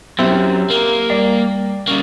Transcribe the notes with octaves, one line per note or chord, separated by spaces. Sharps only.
F#2 C4 E4 G4
A#3
G3 D5
G3 A#3 C#4